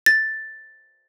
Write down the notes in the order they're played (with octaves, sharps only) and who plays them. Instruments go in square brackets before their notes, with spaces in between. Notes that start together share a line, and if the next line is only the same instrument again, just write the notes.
[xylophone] A6